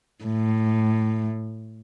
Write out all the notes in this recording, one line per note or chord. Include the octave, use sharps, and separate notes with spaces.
A2